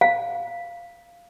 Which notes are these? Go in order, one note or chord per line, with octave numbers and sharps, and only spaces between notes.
F5